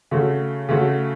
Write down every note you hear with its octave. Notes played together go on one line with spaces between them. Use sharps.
C#3 A3 F#4
C#3 A3 F#4